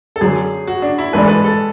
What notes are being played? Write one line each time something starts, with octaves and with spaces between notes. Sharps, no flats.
A4
F#2 D3 F#3 C#4 G#4
F#4
D4
E4
A1 G#2 E3 A3 D4 B4
A4
B4
A4